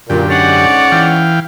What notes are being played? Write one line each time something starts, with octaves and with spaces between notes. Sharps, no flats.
F#2 A#2 D3 G4
G#2 C#4 D5 F#5
E3 F5 G5